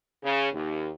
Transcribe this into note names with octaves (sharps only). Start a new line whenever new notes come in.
C#3
D#2